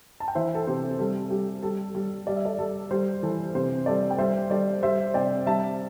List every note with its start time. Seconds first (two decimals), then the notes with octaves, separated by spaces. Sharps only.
0.20 A5
0.28 G5
0.35 E3 C5 E5
0.55 A4
0.67 C3 G4 C5
0.99 G3 A4
1.30 G3 G4
1.63 G3 A4
1.95 G3
2.27 G3 D5
2.36 E5
2.45 A4 D5
2.59 G3 A4
2.91 G3 G4 C5
3.23 E3 A4
3.55 C3 G4 C5
3.86 G3 A4 D5
4.10 G5
4.18 G3 C5 E5
4.50 G3 A4 D5
4.83 G3 C5 E5
5.14 C3 D5 G5
5.46 G3 E5 A5